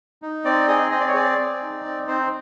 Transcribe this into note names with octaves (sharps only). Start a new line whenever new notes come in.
D#4
C4 D5
G#4 D#5
C4 D#5
D5
C#5
G#4 D5
C4
D#4
C4
C4 C5